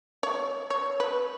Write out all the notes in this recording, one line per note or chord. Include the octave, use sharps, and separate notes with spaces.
C#5
C#5
B4